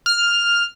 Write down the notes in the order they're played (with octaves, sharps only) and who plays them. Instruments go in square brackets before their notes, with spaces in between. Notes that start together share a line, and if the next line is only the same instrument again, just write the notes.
[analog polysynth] F6